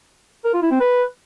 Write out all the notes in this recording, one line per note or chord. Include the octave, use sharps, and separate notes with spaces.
A#4
F4
E4
C4
B4